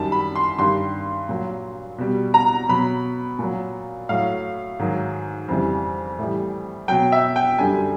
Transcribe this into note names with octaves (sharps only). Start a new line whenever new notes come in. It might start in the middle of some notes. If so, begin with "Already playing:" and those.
Already playing: F#2 D#3 G3 A5
B5
C6
G2 D#3 G3 C6
A#2 F#3
B2 G3
A#5
B2 F#3 B5
A#2 F#3
A2 F#3 F5
G#2 D#3 F#3
F2 C#3 E3 G3
A2 E3 G3
B2 F#3 G5
E5
G5
F#2 D3 G3 G#5